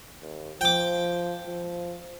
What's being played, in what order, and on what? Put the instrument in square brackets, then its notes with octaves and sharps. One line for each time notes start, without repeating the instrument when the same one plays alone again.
[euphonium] D#2
[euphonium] F3 [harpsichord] G5 D6
[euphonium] F3